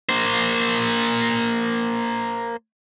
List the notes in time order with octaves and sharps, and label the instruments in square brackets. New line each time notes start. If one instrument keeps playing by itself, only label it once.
[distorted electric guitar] A#3 C5